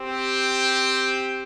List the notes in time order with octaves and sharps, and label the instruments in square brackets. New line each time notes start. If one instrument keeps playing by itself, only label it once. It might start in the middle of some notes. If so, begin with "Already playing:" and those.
Already playing: [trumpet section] C4 G4